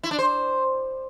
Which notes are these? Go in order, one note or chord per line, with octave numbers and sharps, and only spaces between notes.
E4
D4
C5